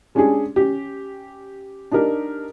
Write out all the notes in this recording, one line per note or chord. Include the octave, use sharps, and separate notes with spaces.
G#3 C#4 D4 G4 G#4
C#4 G4
D4 D#4 G4 A#4